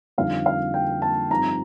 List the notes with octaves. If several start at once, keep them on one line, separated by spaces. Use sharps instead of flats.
F2 D3 G3 C4 D#4 F5
F5
G5
A5
G2 F3 C4 D#4 A#5